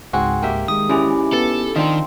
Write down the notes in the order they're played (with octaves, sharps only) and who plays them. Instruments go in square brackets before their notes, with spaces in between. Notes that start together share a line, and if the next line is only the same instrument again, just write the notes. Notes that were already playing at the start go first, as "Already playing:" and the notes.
[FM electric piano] C#2 G#2 [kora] C4 F#4 G#4
[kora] A#3 G4 E5
[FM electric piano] D#3 G#3 [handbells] D#6
[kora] G#2 E3 D5 [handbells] C#4 E4 G4
[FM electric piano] B3 [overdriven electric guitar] A4
[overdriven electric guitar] D#3 [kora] F3 C4 [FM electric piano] D4 D#5